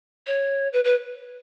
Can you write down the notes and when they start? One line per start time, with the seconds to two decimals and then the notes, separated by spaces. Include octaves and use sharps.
0.27 C#5
0.73 B4
0.84 B4